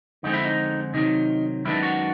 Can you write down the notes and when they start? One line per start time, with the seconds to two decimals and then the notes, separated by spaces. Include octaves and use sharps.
0.23 F2 D3 F3 G#3 C4 D#4
0.33 E4
0.45 D#4
0.94 C3 D#3 F#3 D#4
1.65 F#2 D#3 G#3 B3 D4 E4
1.83 F#4